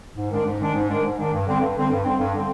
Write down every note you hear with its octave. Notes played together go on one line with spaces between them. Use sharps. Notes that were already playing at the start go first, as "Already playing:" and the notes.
G#2
D#3 G#3 D4
G#2
D#3 G#3 D4
G#2
D#3 G#3 D4
G#2
D#3 G#3 D4
G2
D3 G3 C4
G2
D3 G3 C4
G2
D3 G3 C4
G2
D3 G3 C4